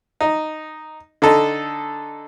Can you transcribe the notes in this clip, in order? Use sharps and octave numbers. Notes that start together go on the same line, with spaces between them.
D#4
D3 D#4 A4